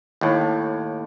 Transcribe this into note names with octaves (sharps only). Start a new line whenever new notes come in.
D#2 A2